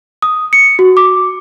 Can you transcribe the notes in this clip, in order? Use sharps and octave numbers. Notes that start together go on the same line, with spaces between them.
D#6
C#7
F#4
D6